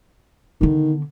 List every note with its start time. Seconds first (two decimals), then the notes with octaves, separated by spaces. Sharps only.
0.61 D3 D#3 B3